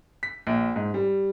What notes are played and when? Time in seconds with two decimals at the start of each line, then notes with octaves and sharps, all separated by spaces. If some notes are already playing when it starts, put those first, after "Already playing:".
0.23 B6
0.47 A#1
0.76 G#2
0.94 G3